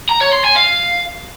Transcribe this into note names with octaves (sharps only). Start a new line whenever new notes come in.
A#5
C#5
C6
G#5
F5